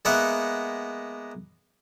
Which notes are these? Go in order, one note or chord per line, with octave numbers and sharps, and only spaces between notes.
G#3 A#3 B3 E5 F#5